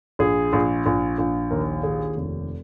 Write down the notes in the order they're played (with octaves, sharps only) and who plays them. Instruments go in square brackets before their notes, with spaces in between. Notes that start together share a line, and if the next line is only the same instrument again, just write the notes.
[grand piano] A#1 G#4
A#1
A#1
A#1
D#2 A#4
D#2 G#4
F1